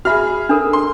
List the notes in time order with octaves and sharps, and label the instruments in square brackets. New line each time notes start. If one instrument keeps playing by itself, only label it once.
[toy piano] F#4 E5 [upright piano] G#4 B5 F6
[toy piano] D4 A4 A#4
[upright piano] C6